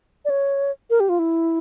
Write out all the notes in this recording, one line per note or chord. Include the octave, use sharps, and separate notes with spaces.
D5
C#5
A#4
G4
F4
E4